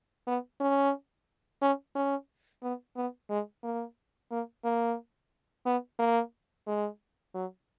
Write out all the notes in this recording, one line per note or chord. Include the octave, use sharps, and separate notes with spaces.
B3
C#4
C#4
C#4
B3
B3
G#3
A#3
A#3
A#3
B3
A#3
G#3
F#3